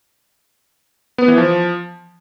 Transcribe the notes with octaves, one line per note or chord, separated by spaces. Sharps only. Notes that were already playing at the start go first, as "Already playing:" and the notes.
B3
E3
F3